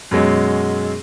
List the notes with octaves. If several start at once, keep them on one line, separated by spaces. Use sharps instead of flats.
F#2 B2 F#3 G#3